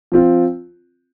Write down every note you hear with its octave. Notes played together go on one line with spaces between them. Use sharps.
F3 C4 F4